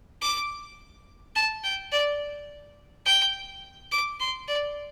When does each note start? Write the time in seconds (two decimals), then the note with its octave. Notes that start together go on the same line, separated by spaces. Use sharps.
0.22 D6
1.35 A5
1.64 G5
1.92 D5
3.06 G5
3.92 D6
4.20 C6
4.48 D5